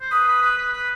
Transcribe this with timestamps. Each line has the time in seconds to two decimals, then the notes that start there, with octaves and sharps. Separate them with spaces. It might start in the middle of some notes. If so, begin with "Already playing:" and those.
0.01 C5
0.11 B4 D#6
0.27 B4
0.42 B4
0.58 B4
0.73 B4